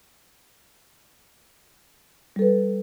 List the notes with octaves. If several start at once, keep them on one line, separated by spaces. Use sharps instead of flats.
G3 A4 B4